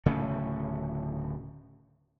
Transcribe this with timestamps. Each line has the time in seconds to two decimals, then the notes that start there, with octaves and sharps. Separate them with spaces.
0.06 D1 C#3 A3 C#4